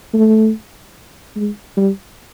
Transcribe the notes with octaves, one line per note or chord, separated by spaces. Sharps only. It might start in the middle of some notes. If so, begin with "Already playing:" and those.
A3
G#3
G3